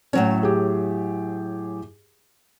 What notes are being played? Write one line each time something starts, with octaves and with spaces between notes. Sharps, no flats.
A2 F#3 C#4 C#5
G4 G#4